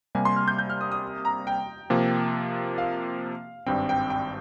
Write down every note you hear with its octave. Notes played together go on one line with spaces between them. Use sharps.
C3 G3 A#3 G#5
C6
F6
G6
G6
F6
D#6
D#6
A#5
G5
C3 F3 A#3
F5
G#1 G2 G3 C4 G5
G5
G5